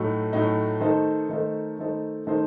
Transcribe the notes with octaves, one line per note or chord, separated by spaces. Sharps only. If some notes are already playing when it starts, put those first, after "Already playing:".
Already playing: A2 F#3 A3 D#4
A2 F#3 A3 D#4
D#3 A3 D#4 A4 C5
D#3 A3 D#4 A4 C5
D#3 A3 D#4 A4 C5
D#3 A3 D#4 A4 C5